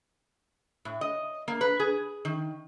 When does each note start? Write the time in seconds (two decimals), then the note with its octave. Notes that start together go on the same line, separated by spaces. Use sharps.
0.85 A2
1.01 D#5
1.48 A#3
1.61 B4
1.80 G#4
2.25 D#3